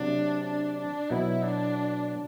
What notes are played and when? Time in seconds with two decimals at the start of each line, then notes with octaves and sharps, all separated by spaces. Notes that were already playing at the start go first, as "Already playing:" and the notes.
Already playing: C3 F#3 A3 D4
0.45 D4
0.77 D4
1.10 B2 F#3 B3 E4
1.42 D4